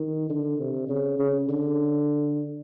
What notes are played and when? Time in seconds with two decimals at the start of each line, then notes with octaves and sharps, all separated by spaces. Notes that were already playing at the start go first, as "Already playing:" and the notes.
Already playing: D#3
0.30 D3
0.60 C3
0.89 C#3
1.19 C#3
1.49 D3